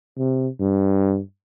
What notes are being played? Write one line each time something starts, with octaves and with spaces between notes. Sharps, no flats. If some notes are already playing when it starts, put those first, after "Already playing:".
C3
G2